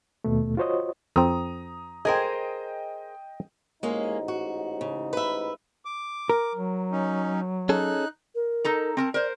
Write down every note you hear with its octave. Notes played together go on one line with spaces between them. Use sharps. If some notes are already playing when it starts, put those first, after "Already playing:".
D#2 B2 A3
F4 F#4 C5 C#5 D#5
F2 C4 A#5 D#6
G#4 A#4 C5 D#5 G5
A1 G#2 G#3 A#3 C#4 D#4
F#4
C#3
B4 E5
D6
A#4
F#3
C#4 D#4
C#4 D#4 G#4 A4 F#6
A#4
D#4 A4 A#5
C4 A#4 A5
A#4 C5 D5